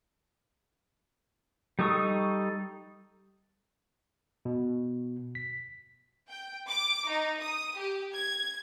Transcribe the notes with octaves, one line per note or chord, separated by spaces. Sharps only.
G3 D#4 A4 C#6 D#6
B2
B6
G5
D6
D#4
D#6
G4
G#6